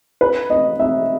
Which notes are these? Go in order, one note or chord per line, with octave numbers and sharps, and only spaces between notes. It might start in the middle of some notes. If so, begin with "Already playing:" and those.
B4
D#5
E5